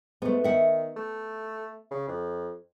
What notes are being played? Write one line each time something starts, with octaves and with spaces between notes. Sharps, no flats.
G#2 A3 B3
D#3 E5 F#5
A3
C#3
F2